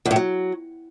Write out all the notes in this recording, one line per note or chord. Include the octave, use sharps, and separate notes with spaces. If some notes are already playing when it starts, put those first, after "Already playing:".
E2
A2
F#3